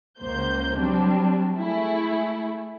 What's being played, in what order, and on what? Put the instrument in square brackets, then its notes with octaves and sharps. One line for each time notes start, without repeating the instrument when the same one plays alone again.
[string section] C#2 A#3 C5 G6
F#3 G3 C4 D4
A3 E4 G#4